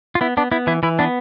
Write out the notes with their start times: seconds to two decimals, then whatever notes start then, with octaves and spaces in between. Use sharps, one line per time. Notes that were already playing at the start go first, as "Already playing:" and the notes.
0.15 F4
0.21 B3 E4
0.37 B3 D4
0.51 B3 E4
0.67 E3 E4
0.83 E3 E4
0.99 B3 D4